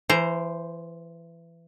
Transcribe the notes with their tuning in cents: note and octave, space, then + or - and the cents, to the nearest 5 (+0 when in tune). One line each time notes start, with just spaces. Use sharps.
E3 +25 C5 +0 A#5 +0